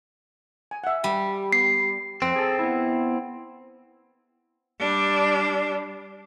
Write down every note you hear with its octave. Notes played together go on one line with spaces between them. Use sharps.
G#5
E5 F#5
G3
B3 C7
F2 C4
G#4 A4
B3 E4
G3 D4